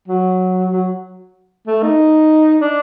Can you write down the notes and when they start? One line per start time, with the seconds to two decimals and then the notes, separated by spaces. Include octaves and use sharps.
0.08 F#3
0.71 F#3
1.67 A3
1.83 D#4
2.62 D4